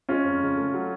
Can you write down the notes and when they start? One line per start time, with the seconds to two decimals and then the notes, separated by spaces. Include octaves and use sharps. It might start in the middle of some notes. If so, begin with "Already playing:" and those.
0.09 G#3 C#4 F4
0.25 F2
0.41 C#3
0.57 A3
0.74 F#3